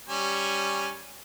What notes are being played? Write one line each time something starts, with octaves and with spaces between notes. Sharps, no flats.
G3 C#4 G#5